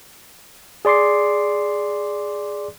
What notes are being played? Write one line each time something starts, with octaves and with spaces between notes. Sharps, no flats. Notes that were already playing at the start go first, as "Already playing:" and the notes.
G#4 D5 C6 D6 C7